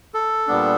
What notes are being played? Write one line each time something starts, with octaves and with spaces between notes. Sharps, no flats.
A4
A#2 G3 B3 D4